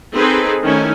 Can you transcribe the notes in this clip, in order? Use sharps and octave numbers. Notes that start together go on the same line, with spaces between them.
C4 D#4 G#4 A4 B4 C5
D#3 A3 C#4 D#4 E4 G#5